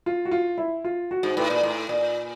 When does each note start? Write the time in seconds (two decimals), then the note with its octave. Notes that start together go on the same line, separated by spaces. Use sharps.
0.06 F4
0.25 F#4
0.31 F4
0.58 E4
0.84 F4
1.11 F#4
1.23 G#2
1.37 A2 B4
1.50 A#2
1.63 A2
1.89 A#2